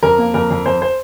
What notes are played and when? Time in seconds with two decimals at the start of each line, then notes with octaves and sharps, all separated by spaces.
0.03 F2 A#4
0.19 A#3
0.34 F2 A#4
0.50 F2
0.66 F2 C5
0.82 C5